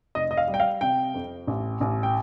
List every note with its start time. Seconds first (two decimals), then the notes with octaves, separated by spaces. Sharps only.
0.15 F1 D#5
0.31 D#5
0.37 F5
0.48 G3
0.54 G5
0.60 F5
0.81 C3 G5
1.14 F2
1.47 A1
1.81 A1
2.03 G5